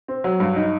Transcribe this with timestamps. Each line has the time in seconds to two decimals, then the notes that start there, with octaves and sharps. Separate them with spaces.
0.08 C4
0.24 F#3
0.40 G2
0.56 D#4